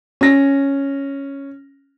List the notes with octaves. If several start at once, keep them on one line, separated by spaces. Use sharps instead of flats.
C#4 A#6